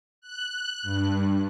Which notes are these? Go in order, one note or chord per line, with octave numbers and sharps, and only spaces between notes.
F#6
G2